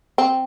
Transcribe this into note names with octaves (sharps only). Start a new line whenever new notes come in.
C4